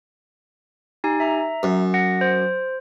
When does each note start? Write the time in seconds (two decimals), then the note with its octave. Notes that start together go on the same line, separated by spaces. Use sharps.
1.04 D#4 G4 G#5
1.20 E5 A#5
1.63 F#2
1.94 F#5 A#6
2.21 C5